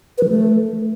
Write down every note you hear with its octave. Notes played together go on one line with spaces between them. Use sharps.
B4
F3
A3